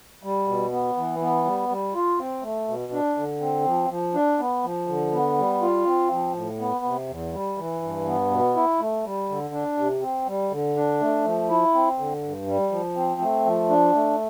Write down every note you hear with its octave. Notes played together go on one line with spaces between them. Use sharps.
G3
B2
B3
E3
B3
G3
G3
F4
C4
A3
B2
D4
D3
C4
F3
F3
D4
B3
F3
D3
B3
G3
F4
C4
F3
A2
B3
C3
E2
G3
E3
G2
B3
B2
E4
A3
G3
D3
D4
C3
C4
G3
D3
D4
A3
F3
E4
C4
D3
G2
G3
F3
C4
A3
F3
D4
A3